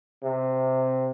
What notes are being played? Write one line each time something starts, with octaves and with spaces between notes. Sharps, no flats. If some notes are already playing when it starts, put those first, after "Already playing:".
C3